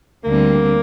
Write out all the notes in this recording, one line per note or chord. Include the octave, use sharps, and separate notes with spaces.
D2 D3 G3 A#3 C4